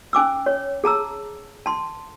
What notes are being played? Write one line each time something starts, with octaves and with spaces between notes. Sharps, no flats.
C#4 G#5 D6 E6
C#5
G#4 A5 A#5 E6
A5 C6